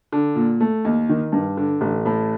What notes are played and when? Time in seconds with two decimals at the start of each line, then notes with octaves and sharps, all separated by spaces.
0.12 D3
0.35 A#2
0.60 A3
0.85 D#2
1.09 D#3
1.32 G2
1.57 D3
1.81 A1
2.06 A2